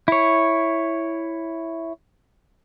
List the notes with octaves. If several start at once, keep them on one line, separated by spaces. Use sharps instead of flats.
E4 C#5